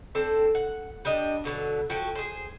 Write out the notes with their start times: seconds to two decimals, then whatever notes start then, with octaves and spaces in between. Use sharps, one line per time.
0.15 C4 D4 A4 C5
0.55 F#5
1.05 G3 D4 D#5
1.44 B2 D3 F#3
1.90 F3 F#4 A4 G5
2.15 G#4 C5